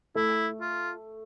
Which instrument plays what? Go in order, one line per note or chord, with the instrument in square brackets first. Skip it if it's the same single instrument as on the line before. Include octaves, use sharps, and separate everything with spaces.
[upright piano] A3 [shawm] E4
[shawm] F4